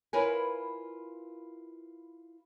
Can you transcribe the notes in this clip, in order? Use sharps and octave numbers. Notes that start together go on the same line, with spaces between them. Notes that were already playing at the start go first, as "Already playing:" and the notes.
E4 F4 A#4 B4 C#5 G#5